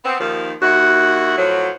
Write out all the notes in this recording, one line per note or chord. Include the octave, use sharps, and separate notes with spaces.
B3 C4
D#2 D#3 F3
D#2 E4 F#4
A2 F3 F#3